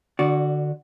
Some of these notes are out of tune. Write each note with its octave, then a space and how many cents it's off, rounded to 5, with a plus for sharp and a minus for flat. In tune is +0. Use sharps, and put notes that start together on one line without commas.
D3 +15 F#4 +0 D5 -15